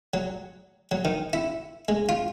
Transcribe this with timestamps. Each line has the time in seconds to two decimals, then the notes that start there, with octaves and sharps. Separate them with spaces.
0.14 F#3
0.91 F#3
1.05 D#3
1.33 E4
1.88 G#3
2.09 F4